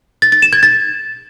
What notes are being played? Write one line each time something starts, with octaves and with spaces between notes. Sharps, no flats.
A6
A6
E7
G#6
A6